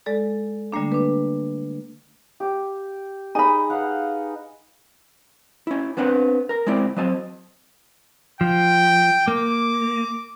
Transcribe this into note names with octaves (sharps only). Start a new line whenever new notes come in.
G#3 A4 D5
D3 G3 A3 A#3 D4
D4 B4
G4
D#4 G#4 D#5 G#5 B5
B4 F5 F#5
C#4 E4
B3 C4 D4 B4 F#5
A#4 A#5
G#3 C4 E4 D5
F#3 C4 D#5 A5
F3 G5
A#3 D6